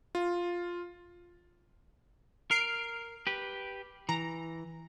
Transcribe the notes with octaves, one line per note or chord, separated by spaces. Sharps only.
F4
A#4 F6 C7 D7
G4 B4
E3 A#5